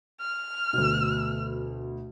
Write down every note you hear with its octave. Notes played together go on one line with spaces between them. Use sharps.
F6
D2 B2